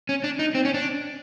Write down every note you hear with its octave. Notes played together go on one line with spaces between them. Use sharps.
C#4
D4
D#4
C4
C#4
D4